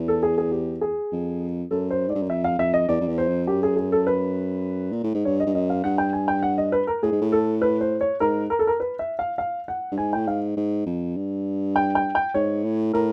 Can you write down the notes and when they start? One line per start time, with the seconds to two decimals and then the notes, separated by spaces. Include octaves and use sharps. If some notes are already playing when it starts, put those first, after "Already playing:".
Already playing: E2
0.08 A4
0.23 G#4
0.38 G#4
0.51 G4
0.81 G#4
1.12 F2
1.70 F#2 A4
1.91 C5
2.07 G#2 D5
2.15 G2
2.22 F#2
2.29 F2 E5
2.44 F5
2.59 F2 E5
2.74 D#5
2.88 E2 D5
3.01 F2
3.08 E2
3.18 C5
3.28 F2
3.47 F#2 G4
3.63 G#4
3.77 G#4
3.92 A4
4.07 B4
4.92 A#2
5.03 A2
5.14 G#2
5.25 G2 C#5
5.40 D#5
5.46 G2
5.54 F#2 D#5
5.70 F5
5.84 G2 F#5
5.98 G5
6.13 G#5
6.28 G5
6.43 F#5
6.58 D#5
6.72 B4
6.87 A#4
7.02 A2 G#4
7.12 G#2
7.21 A2
7.32 A4
7.62 B4
7.81 C5
8.01 C#5
8.20 G#2 A#4
8.50 A#4
8.59 A4
8.67 A#4
8.80 B4
8.99 E5
9.19 F5
9.38 F5
9.68 F#5
9.92 G2
9.98 G#2 G#5
10.13 A2 G5
10.27 G#2 F5
10.57 G#2
10.86 F2
11.16 G2
11.76 G5
11.95 G5
12.15 G5
12.34 G#2 C#5
12.64 A2
12.93 A2 A#4